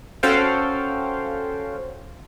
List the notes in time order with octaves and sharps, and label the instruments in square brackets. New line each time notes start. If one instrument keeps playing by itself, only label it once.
[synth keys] C#4 F#4 A4 C5 F5 G5